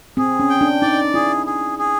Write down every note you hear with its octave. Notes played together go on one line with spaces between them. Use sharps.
C4 G#4
C#4
G5
D4
D#4 D5
E4 G#4
G#4
G#4